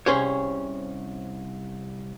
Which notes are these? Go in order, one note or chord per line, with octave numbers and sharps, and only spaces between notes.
C2 C#4 G#4 C5 C#5